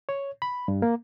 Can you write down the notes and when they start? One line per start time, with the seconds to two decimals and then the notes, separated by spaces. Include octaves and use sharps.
0.09 C#5
0.42 B5
0.68 G2
0.82 A#3